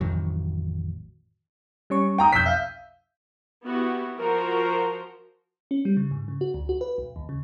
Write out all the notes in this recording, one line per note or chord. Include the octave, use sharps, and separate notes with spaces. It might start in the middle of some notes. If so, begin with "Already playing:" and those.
A1 F2 D#3 F#3
G3 C#4 C#6
G5 A#5 D#6
B1 F2 E6 G6 B6
E5 F5
B3 E4 F#4 G4
F3 F#4 A#4 C5 A#5
C#4
G3
C#3
G#2
C#3
F#4
D2
F#4
B4
B1
D#2
C#3